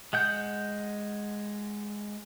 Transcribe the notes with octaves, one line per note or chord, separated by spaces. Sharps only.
G#3 F#5 G6